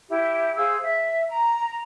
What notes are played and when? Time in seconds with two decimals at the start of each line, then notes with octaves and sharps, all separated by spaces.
0.09 E4 G4
0.56 G#4 C5 F5 E6
0.82 E5
1.29 A#5